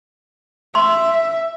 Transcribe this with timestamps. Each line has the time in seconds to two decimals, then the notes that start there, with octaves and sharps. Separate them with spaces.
0.75 E5 C6